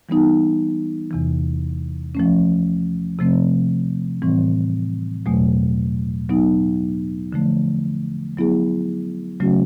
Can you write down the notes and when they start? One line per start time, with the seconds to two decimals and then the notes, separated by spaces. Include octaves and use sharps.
0.09 E3 G3 B3 D#4
1.11 E2 C3 E3
2.15 F3 A3 C#4
3.19 C3 F3 A3 C4
4.22 A2 E3 G3 C4
5.26 E2 B2 F#3 A3
6.30 F#3 B3 D#4
7.33 D3 F3 A3
8.37 F#3 B3 E4 G#4
9.40 C#3 F#3 A3 C#4 F#4